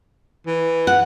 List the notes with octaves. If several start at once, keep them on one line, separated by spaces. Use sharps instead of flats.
E3
F#5